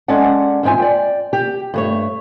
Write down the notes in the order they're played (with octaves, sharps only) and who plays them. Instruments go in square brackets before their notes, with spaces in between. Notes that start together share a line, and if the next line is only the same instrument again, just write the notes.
[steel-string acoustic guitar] G#3 C#4 A4 D5 F#5
E2 G#2 C4 F4 G#5
D5 G5
G4
G2 A3 C#5